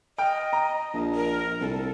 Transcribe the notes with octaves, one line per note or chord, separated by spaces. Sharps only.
D#5 G5 F6
A#5
A#1
A#4
C2 A4